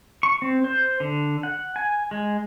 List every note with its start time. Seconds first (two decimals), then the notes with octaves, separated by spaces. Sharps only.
0.23 C#6
0.42 C4
0.64 C5
1.00 D3
1.43 F#5
1.76 G#5
2.11 G#3